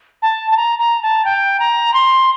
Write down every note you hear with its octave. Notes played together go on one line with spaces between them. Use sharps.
A5
A5
A#5
A#5
A5
G5
A#5
C6